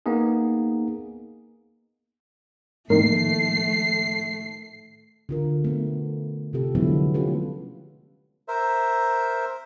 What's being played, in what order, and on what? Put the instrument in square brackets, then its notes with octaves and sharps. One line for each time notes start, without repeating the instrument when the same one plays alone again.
[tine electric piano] A#3 B3 D#4 G#4
[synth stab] A2 D#3 [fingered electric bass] F3 A#3 C4 [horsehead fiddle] A3 [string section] C7
[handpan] D3 F4 A#4
A3 B3
C3 F4 G4 A4
D3 F3 F#3 G#3 B3 E4
A3 C#4 F4 G4 A4 B4
[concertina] A#4 C5 E5